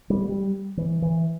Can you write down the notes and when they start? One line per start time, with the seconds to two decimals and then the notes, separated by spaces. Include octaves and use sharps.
0.10 G3
0.29 G3
0.77 E3
1.02 E3